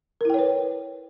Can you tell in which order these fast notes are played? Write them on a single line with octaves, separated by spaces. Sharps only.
A#4 E4 G5 C#5 B4